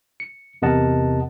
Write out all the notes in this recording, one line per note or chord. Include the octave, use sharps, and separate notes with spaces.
C#7
E2 C3 A#4 D#5 F#5 A5